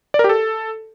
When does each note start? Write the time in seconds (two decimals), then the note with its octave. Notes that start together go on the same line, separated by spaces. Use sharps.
0.14 D5
0.19 A#4
0.24 G4
0.29 A4